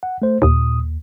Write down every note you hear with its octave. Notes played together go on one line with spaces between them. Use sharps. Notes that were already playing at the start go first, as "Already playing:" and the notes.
F#5
A3 C5
D#2 A#2 D#6